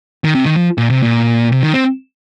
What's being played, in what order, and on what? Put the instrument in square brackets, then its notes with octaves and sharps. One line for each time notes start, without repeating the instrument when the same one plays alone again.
[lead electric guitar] D#3
C3
D#3
F3
A#2
C3
A#2
C3
D#3
C4